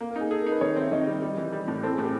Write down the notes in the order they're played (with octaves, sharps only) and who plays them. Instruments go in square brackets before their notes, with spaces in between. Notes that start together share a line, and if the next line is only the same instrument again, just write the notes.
[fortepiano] A#3 [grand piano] A#4
[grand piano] A#4
[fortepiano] D#4
[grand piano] G#4
[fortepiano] G#4 [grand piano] A4
[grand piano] A#4
[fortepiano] D#4
[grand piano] B4
[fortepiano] D#3 [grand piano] C#5
[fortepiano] C4 [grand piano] E5
[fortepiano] D#3 [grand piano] D#5
[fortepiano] G3
G3
E3
G3
A2
[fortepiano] C4 [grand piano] A4
[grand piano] G#4
[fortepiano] A2
[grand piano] G4